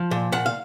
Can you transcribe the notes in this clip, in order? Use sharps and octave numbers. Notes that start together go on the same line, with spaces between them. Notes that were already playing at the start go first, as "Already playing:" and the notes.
Already playing: F3
A#2
A#2 F#5
F5